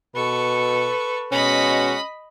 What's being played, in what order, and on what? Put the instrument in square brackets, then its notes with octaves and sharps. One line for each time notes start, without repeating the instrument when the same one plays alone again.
[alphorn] B2 [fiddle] A4 C#6 [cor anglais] B4
[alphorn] B2 [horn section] G#3 C#4 F#4 [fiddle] D#5 B5